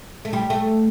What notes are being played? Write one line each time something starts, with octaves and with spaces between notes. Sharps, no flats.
A3
G3
A3